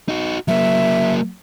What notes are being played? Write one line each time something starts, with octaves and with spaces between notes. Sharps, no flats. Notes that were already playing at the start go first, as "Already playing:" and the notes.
D#4 F#4
F#3 A#3 E5